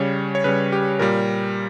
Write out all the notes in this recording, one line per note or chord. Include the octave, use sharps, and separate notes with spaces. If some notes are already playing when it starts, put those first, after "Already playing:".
Already playing: C#3 G3 C#5
C#5
C#3 G3 B4
G4
A#2 G3 A#4